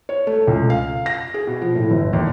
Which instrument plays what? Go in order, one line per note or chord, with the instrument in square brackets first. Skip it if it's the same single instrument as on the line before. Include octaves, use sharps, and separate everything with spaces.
[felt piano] C#5
A3
C#2
F5
A#6
G#4
B2
F3
A2
G1
D#2